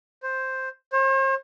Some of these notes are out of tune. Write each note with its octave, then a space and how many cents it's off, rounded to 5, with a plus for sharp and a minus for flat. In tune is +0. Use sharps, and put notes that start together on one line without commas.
C5 +5
C5 +45